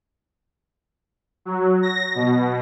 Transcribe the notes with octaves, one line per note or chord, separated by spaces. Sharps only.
F#3
A#6
B2